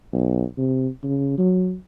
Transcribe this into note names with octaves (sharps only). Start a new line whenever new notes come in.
B1
C3
C#3
F#3